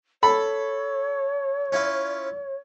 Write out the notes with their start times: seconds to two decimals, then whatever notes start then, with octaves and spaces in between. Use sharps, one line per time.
0.23 A4 C#5 B5
1.72 C#4 E4 F4